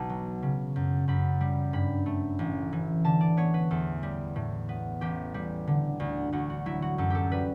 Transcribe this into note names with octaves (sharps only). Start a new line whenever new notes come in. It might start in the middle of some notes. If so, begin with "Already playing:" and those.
Already playing: B1 A5
F#3
C#3
F#2
F#2 B5
G3
G2 B5
A3
A1
E3
D3 A5
D5
B3 C#5
B4
E2 A4
G3
A2
B3
A1 G4
G3
D3
D2
D2 F#4
F#4
F#3 E4
F#4
F#2 A4
G4 A4
G3 B4